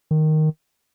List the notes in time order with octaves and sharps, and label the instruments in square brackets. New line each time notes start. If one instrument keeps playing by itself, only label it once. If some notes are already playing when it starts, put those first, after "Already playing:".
[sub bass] D#3